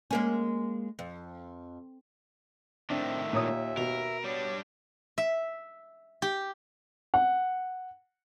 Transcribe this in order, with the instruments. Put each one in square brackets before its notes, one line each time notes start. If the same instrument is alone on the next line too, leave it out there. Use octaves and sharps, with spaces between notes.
[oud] G#3 A#3 C#4
F2
[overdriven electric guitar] A2 D#3 [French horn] C4 [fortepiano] D4 [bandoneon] E5
[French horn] D#2 [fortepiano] A#2 C#5 D#6
[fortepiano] B2 [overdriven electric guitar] A#4
[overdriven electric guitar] G3 D4 [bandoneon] B3 [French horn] C#5
[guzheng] E5
G4
[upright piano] F#5